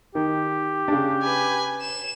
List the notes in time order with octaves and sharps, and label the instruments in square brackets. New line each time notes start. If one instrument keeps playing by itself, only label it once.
[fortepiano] D#3 [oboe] G4
[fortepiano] C#3 D4
[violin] B4 G#5
E7